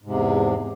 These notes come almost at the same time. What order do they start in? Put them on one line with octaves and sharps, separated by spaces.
G#2 C3 E2